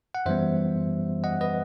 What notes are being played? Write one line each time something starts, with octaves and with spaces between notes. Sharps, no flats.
F#5
F#2 E3 G3 B3 C5 E5
D#5 F#5
B4 D#5